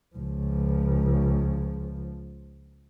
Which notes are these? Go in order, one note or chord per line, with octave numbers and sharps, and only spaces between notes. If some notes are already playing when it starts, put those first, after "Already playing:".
C#2 F3